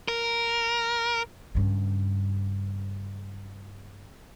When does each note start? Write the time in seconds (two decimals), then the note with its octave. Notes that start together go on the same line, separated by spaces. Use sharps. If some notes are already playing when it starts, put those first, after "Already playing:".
0.08 A#4
1.55 G2 C#3